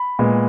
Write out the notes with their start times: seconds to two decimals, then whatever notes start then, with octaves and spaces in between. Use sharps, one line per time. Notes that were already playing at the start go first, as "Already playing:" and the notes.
Already playing: B5
0.19 A#2 G#3 B3